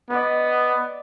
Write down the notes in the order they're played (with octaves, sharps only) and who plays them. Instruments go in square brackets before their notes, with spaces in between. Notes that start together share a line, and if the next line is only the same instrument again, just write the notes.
[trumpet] B3 [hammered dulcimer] D5 D#5